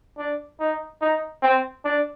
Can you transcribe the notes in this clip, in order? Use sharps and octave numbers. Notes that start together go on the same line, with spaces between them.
D4
D#4
D#4
C4
D4